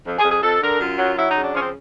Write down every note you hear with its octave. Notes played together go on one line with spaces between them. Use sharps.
F2
G#4
F2
G#4
F2 A4
D3 A#4
F#2 F4
F#3
F#3 E4
D#4
C#3
D4
F3 C#4
C4